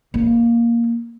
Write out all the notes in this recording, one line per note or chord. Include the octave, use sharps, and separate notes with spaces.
A#3